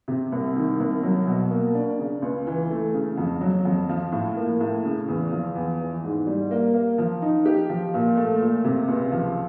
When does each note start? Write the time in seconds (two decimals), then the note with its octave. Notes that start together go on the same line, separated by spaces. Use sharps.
0.08 C3
0.32 C2
0.56 D#3
0.80 C2
1.03 F#3
1.27 B2
1.50 A#3
1.75 D4
1.99 C#3
2.22 C#2
2.47 E3
2.70 A3
2.94 C#3
3.18 F2
3.41 F#3
3.65 F2
3.89 F3
4.12 A2
4.37 A#3
4.61 A2
4.85 C#3
5.08 E2
5.32 F3
5.55 E2
5.80 E3
6.03 G#2
6.27 G3
6.51 A#3
6.74 A#3
6.98 F3
7.22 D#4
7.45 G4
7.69 F3
7.94 A#2
8.17 A3
8.41 A#2
8.64 C3
8.88 C#2
9.12 F3